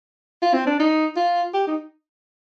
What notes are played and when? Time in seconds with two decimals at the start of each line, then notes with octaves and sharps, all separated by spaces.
0.42 F4
0.54 C4
0.66 D4
0.79 D#4
1.16 F4
1.54 G4
1.67 D#4